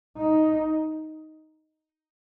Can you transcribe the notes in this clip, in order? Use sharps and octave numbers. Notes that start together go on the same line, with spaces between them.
D#4